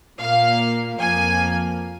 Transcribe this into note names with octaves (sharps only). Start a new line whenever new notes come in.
A#2 A#3 F5
F2 F3 A#3 G#5